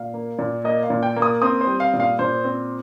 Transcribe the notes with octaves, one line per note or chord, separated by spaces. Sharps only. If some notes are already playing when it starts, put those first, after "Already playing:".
Already playing: A#2 F5
A#3
A#2
A#3 D#5
F5
A#2
G5
A#3
D#6
C4 D#6
C5
G3
F5
A#2
F5
A#2 C5
C4